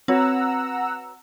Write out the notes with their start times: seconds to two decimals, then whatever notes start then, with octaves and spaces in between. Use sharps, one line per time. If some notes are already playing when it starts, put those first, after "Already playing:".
0.08 C4 F#4 B4 C#5 F#5 A#5 E6